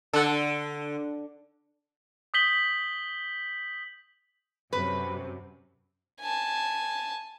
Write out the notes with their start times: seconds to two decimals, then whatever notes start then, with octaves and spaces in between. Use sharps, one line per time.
0.13 D3 A4 F#5
2.34 D#6 G6 B6 F#7 G7
4.73 F#2 C3 B4
6.21 G#5 A5